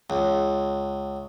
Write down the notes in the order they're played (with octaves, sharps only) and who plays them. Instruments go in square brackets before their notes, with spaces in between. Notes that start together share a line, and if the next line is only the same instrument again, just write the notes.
[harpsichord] C#2